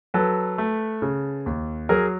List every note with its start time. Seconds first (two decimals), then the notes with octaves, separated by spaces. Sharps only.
0.14 F#3 A4 B4
0.58 A3
1.02 C#3
1.46 D#2
1.89 F#3 G#4 A#4